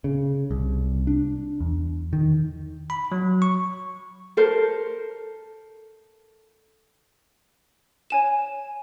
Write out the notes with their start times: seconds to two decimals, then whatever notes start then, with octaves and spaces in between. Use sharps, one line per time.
0.04 C#3
0.51 C2
1.07 D4
1.60 E2
2.13 D#3
2.90 B5
3.12 F#3
3.42 C#6
4.37 A4 A#4 C5
8.10 C#5 G#5 E7